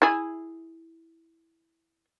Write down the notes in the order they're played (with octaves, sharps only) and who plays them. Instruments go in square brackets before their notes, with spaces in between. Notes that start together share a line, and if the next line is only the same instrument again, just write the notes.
[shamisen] E4 G#4